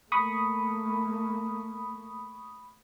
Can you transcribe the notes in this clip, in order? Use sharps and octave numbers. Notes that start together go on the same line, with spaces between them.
A3 A#3 B5 C#6 D#6